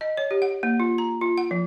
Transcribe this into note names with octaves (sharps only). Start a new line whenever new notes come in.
D#5
C#5
G4
F#5
A#3
F4
A#5
F4
F#5
F3